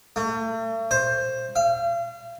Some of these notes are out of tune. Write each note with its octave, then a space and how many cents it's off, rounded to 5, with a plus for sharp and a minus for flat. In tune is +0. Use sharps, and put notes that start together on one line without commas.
A3 +40
C5 +10
F5 -35